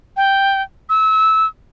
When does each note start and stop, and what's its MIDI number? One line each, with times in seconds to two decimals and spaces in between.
0.17 0.62 79
0.89 1.46 88